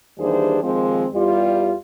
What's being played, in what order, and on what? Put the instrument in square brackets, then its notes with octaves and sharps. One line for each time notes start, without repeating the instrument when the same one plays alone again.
[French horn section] D#2 E3 G3 D4 G#4 C5
D#2 D#3 F3 G#3 C4
E2 G3 F4